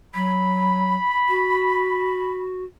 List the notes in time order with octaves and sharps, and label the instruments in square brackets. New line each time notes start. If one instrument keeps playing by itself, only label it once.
[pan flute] F#3 [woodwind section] B5
[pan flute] F#4